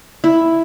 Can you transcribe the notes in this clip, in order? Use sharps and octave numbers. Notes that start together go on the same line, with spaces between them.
E4